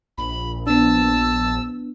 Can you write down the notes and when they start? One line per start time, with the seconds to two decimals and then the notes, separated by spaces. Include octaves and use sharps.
0.18 A#1 B5
0.67 B3 D4 A5 E6